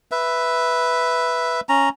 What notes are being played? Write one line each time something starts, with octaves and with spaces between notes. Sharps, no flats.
B4 E5
C#4 A#5